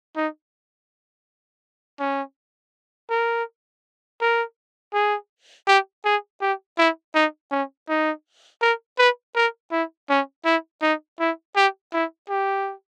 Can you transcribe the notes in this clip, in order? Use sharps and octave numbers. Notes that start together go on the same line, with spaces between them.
D#4
C#4
A#4
A#4
G#4
G4
G#4
G4
E4
D#4
C#4
D#4
A#4
B4
A#4
E4
C#4
E4
D#4
E4
G4
E4
G4